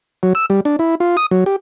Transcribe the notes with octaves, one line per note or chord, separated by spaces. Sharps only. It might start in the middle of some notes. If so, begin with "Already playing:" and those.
F#3
E6
G3
D4
E4
F4
D#6
F#3
G4